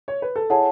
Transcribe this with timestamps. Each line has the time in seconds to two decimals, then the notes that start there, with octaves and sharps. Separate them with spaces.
0.08 C#5
0.22 B4
0.36 A4
0.50 E4 G#4 C#5 F#5 A5